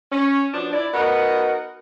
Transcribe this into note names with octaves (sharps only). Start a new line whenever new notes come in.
C#4
F3 F#3 B3 D4
E4 D5
B3 D#4 F#4 A#4 F#5